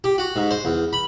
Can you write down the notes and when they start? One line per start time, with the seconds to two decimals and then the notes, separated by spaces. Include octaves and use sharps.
0.04 G4
0.18 F#4
0.36 G#2
0.51 C5
0.65 E2
0.93 B5